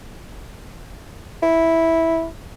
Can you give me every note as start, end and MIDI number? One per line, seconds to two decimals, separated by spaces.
1.43 2.26 64